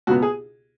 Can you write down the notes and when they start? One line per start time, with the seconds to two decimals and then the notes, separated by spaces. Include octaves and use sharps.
0.07 C#2 B2 B3 F#4
0.22 G#4